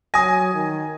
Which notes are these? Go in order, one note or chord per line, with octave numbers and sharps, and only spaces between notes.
F#3 G#5 D#6 A#6
D#3